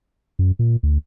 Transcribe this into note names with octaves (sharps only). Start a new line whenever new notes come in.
F#2
A#2
D2